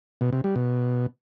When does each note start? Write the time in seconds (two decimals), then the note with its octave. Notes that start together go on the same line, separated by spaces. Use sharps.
0.21 B2
0.33 C3
0.44 G3
0.56 B2